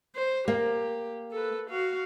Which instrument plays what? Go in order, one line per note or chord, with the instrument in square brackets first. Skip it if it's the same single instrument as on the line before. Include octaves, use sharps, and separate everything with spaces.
[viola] C5
[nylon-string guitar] A#3 [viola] G4
[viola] A4 B4
F#4 F5